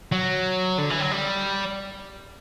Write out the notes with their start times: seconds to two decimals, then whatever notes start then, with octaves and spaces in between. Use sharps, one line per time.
0.12 F#3
0.78 D3
0.90 E3
1.00 F#3
1.11 G3